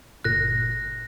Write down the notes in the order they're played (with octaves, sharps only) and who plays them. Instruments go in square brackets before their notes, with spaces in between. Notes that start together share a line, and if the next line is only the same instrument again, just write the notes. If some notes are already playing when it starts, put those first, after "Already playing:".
[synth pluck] G1 A#2 [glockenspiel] F#6 A#6